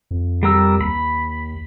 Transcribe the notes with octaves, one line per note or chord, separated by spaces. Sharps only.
F2
G3 A#4 E6
D#2 B5